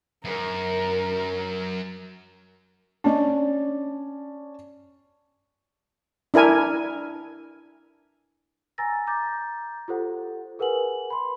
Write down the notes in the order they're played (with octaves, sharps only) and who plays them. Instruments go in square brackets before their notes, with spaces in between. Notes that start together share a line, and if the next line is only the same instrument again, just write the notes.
[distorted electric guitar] F#2 [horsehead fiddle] A#4
[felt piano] C#4 D5 A5 [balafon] D4 D#5
[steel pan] D4 E4 A#4 G#5
[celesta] G#5 A#5 E6 A6 A#6
A#5 D6 G6 A6
F4 G4 A4 C5 F#5
G#4 A#4 B4 F#5 G#5 F#7
B5 C6